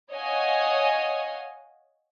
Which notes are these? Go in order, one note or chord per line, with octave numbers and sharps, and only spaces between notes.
C#5 D#5 F5 F#5 G#5